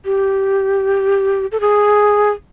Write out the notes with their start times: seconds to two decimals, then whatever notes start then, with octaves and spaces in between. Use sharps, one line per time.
0.05 G4
1.52 A4
1.61 G#4